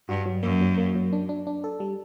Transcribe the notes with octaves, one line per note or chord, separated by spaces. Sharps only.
G2 F#4
F#3
F#2 A#3
F#3
A#3
F#3
D4
D4
D4
A4
G3